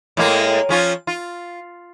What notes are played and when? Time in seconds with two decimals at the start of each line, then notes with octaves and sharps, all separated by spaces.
0.17 A2 G#3 A#3
0.69 F3 C#4 F4
1.07 F4